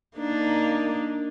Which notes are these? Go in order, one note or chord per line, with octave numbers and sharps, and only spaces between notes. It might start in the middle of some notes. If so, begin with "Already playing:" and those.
A#3 D4 D#4